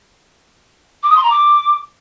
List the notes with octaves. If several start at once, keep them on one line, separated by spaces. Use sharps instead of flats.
D6
D#6
C6
A#5
D6